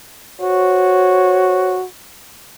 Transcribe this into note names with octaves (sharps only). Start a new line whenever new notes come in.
F#4 C5 C#5